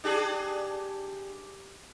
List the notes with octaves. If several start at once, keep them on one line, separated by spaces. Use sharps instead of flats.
D4 G4 G#4